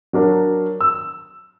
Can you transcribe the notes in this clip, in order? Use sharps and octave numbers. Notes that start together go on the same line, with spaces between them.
F#3 D4 A#4 C#5
E6